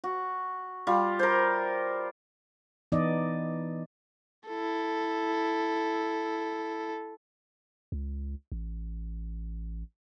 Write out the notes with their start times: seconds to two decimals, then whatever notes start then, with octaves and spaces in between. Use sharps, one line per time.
0.04 F#4
0.87 G3 F4
1.19 A#4 C5
2.92 E3 B3 D#4 D5 D#5
4.48 E4 A4
7.92 C#2
8.52 A1